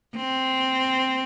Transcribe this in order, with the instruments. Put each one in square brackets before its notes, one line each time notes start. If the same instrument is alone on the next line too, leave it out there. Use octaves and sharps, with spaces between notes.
[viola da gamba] C4